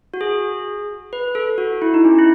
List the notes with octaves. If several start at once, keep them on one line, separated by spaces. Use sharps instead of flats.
F#4
G#4
B4
A4
F#4
E4
D#4
C#4
E4